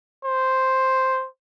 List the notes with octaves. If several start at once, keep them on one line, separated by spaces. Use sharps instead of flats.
C5